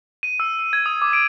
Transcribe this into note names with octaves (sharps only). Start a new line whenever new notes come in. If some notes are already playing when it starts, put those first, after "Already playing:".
D#7
E6
E6
G#6
D#6
D6
D7